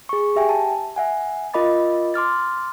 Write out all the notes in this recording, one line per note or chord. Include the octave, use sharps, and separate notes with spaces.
G#4 C#6
G4 E5 G5 G#5
A5
E5 F#5 G#5
F4 A#4 D#5 B5 D6 A6
C6 D6 F6 A6